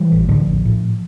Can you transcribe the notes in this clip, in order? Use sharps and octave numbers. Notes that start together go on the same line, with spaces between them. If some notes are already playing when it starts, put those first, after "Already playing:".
Already playing: E3 G3
A1
A2 D3 F3
A#1
A2